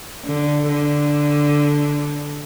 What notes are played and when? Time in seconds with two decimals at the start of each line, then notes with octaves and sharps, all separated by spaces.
0.24 D3
0.68 D3